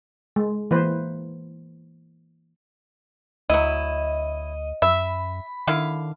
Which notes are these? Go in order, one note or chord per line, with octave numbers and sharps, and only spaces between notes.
G#3
E3 A#3 B4 C5
D2 F#3 E4 D#5
F#2 E5 B5
D3 D#3 E4 F5